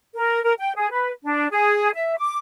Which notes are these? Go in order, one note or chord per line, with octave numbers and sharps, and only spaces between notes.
A#4
A#4
G5
G#4
B4
D4
G#4
E5
D6